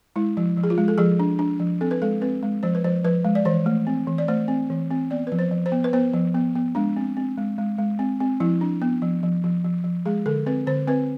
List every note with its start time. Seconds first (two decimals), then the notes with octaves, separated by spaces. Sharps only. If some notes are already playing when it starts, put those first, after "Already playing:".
0.16 G#3 E4
0.37 F3
0.57 F3
0.63 G#4
0.70 F4
0.78 G#3
0.88 A4
0.98 F3 G#4
1.19 D4
1.39 D4
1.60 F3
1.81 C4 A4
1.91 B4
2.02 G#3 A4
2.21 C4 B4
2.43 G#3
2.63 F3 C5
2.75 B4
2.84 F3 C5
3.04 F3 B4
3.25 G#3
3.35 D5
3.45 E3 C5
3.66 A3
3.87 C4
4.07 E3
4.18 D5
4.28 A3 C5
4.48 C4
4.70 E3
4.91 C4
5.11 B3 D5
5.27 F3 B4
5.39 C5
5.51 F3
5.66 C5
5.72 B3
5.84 B4
5.93 B3 C5
6.13 F3
6.35 B3
6.55 B3
6.75 G#3 D4
6.96 C4
7.17 C4
7.38 G#3
7.58 G#3
7.78 G#3
7.99 C4
8.20 C4
8.40 F3 E4
8.61 D4
8.82 B3
9.02 F3
9.23 F3
9.44 F3
9.64 F3
9.84 F3
10.06 G#3 G#4
10.26 D3 A4
10.46 C4 B4
10.67 D3 C5
10.88 C4 B4